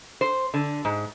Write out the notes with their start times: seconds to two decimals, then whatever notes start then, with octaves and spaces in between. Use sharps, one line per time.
0.21 C5
0.54 D3
0.85 G#2